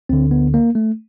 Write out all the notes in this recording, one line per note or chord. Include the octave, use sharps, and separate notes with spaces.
D2 D3 C4
B3
A#3
A3